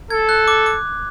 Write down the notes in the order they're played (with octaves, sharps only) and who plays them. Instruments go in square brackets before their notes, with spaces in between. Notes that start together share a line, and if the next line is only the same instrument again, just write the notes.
[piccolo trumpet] A4 [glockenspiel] G#6
[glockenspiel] F#6
D6
D6